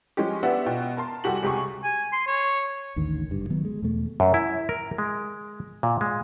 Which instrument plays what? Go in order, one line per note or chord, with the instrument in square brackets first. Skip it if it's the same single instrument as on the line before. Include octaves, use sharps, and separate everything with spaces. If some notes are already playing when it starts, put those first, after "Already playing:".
[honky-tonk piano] F3 G#3 C#4 G4
B3 D4 G4 E5 F#5
B2 F4 G5
A#4 A5 C6
C2 F#4 G4 A4 G#5 F#7
C#2 C3 G4 G#4 C#6
[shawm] G#5
C6
C#5
[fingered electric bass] A1 D#2 D3 D#3
F#1 G2
D#3 F#3 B3
G#3
E2 B2 A3
[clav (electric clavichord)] F#2
E4
A#4
G#3
A#2
G#3